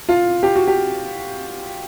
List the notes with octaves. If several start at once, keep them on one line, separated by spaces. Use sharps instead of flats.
F4
G4
F#4
G4